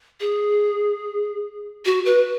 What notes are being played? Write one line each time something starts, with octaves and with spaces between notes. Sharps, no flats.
G#4
F#4
B4